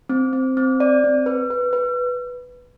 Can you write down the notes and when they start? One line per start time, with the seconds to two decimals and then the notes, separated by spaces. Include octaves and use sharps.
0.09 C4
0.33 C4
0.57 C4
0.80 D5
1.04 C4
1.26 B4
1.50 B4
1.73 B4